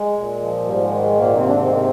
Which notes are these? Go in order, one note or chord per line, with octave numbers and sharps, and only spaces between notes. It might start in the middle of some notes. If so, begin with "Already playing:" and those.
Already playing: G#3
A#2
F3
G#2 G3
G#3
D#3
G#3
G#2
A#2 A#3
G#2 C3 C4
D4
C3 C4
D#3
A#3
C3 C4